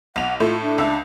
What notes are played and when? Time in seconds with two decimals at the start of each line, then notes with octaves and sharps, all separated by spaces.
0.16 B1 F#5 F7
0.40 A2 A3 F4
0.62 D4
0.78 C#2 E5